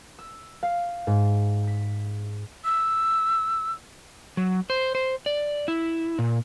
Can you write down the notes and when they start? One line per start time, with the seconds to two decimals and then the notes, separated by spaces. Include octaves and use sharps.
0.19 E6
0.63 F5
1.07 G#2
1.67 B6
2.65 E6
4.37 F#3
4.70 C5
4.95 C5
5.26 D5
5.68 E4
6.19 A#2